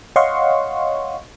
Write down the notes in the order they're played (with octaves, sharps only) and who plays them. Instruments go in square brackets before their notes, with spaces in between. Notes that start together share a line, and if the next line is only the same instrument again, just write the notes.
[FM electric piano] C#5 D#5 F5 F#5 C6 C#6